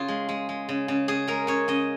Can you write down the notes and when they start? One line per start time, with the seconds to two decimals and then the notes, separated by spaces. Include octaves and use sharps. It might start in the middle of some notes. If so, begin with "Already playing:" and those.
Already playing: C#3 F4
0.08 G#3
0.29 G#3
0.49 G#3
0.69 C#3
0.88 C#3
1.08 C#3 G#4
1.28 G#3 A#4
1.47 C#3 C#5
1.68 C#3 D#5